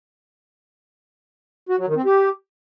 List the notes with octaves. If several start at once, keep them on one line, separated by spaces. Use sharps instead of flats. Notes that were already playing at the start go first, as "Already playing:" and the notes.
F#4
F#3
D#3
C4
G4